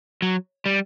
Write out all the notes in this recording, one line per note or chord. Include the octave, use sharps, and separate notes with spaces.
F#3
G3